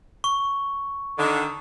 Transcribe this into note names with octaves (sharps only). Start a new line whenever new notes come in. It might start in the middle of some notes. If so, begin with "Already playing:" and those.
C#6
D3 D#3